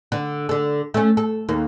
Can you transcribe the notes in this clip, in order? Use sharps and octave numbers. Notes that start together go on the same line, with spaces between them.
D3
D3 A4
A3 C#4
A4
D#2 A#3